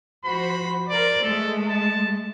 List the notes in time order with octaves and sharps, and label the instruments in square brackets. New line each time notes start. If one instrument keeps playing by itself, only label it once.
[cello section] F3 F#4 C5 [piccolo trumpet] B5
[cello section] A#4 C5 [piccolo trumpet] D5
[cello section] G#3 A3 [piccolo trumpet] A4
[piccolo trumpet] A5